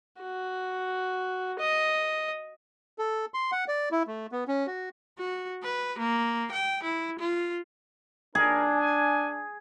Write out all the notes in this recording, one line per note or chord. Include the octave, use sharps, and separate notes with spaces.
F#4
D#5
A4
C6
F#5
D5
E4
A3
B3
C#4
F#4
F#4
B4
A#3
G5
E4
F4
D4 G#4 A#4
G#5